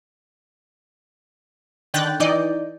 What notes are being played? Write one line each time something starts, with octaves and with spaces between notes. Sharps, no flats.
D3 D#3 G5 F#6 G6 A6
E3 D#4 D5 D#5 G6